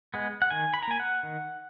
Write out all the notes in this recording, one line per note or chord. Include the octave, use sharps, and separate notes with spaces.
G#3 B3
F#5
D#3 G#5
B5
A#5
A#3 G#5
F#5
D#3